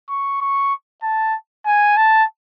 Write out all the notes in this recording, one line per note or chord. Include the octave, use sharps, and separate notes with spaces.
C#6
C#6
A5
G#5
A5